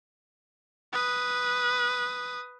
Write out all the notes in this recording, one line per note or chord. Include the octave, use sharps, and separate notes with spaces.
B4 D#6